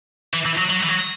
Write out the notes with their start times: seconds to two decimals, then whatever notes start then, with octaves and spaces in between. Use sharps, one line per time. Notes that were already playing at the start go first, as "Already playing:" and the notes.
0.34 E3
0.46 E3
0.58 F#3
0.70 F#3
0.83 E3
0.88 F#3